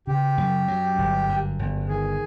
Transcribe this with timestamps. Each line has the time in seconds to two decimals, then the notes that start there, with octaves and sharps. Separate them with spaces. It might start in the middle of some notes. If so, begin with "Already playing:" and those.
0.07 C#3 G4
0.37 F#2
0.68 F#3
0.98 G1
1.29 F#2
1.59 G1
1.89 D#3 G#4